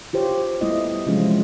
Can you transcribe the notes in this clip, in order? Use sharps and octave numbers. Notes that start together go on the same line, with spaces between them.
F4 G4 C5 C#5
G3 A3 B3 E4 D#5
C3 E3 F3 G#3 C#4 F4